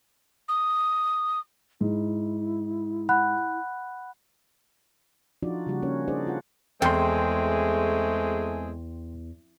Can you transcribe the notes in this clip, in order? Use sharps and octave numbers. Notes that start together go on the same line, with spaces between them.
D#6
G#2 E4
F#5 B5 F#6
F3 D4 D#4 F4 F#4 D5
C#3 G3 A#3 F#4 G4
A#3 C#4 A#4 C#5
D4 D#4 G#4 C5 D5 D#5
F4 F#5
E2 G#3 A3 C4 G#4 G5 C6